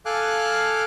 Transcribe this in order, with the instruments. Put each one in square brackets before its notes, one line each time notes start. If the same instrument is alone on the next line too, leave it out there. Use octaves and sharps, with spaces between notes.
[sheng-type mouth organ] A4 F5 G#5 D6 F6 F#6